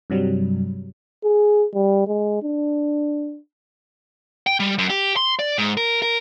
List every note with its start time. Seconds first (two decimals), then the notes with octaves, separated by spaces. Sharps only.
0.10 G2 C3 F#3 G3
1.24 G#4
1.74 G3
2.07 G#3
2.43 D4
4.47 G5
4.60 G3
4.78 F#2
4.90 G4
5.16 C6
5.39 D5
5.58 G#2
5.77 A#4
6.02 A#4